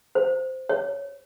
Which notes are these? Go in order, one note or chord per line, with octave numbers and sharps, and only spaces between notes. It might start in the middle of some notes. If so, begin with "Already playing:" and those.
C5
C#5